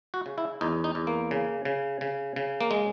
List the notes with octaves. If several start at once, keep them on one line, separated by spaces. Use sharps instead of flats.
F#4
C#3
E4
E2 D#4
D#4
E2
A#3
C#3
C#3
C#3
C#3
A#3
G#3